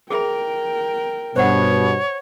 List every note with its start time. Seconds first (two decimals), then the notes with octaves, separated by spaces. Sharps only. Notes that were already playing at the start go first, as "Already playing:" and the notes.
0.10 G#4 A#4 E5 G5 B5
1.36 G2 B2 C5 C#5 F#5